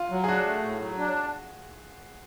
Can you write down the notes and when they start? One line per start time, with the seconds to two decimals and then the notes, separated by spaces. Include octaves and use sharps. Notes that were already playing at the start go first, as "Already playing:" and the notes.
Already playing: F4
0.11 F#3
0.24 G#4
0.28 D4 F#4
0.46 A3
0.63 A2
0.80 F#3
0.98 D4